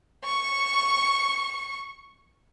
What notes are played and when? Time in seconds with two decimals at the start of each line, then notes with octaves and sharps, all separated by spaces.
0.24 C#6 C#7